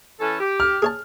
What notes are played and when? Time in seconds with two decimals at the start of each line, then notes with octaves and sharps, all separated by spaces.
0.20 E3 C#4 A4
0.40 G4
0.60 F6
0.82 G#4 C#5 A5